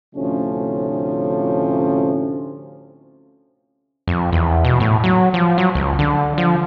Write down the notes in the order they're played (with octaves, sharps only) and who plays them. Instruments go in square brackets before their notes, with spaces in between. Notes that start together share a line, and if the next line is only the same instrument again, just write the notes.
[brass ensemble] D2 A2 C3 F3 A3 C#4
[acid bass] F2
E2
B2
A2
F#3
F3
F#3
C#2
D3
F3